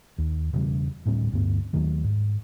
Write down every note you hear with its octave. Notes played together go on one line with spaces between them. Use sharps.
D#2
E1 E2 C#3 G3
D2 A2 G3 C4
D2 G2 B3
D#2 D#3 F#3 A3
G#2